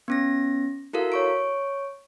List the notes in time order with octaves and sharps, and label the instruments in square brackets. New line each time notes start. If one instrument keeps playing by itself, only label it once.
[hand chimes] B3 C#4 A#6
E4 F#4 A4 A#4 F5
C#5 C#6 D7